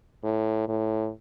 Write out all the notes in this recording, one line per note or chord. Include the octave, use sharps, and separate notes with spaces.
A2
A2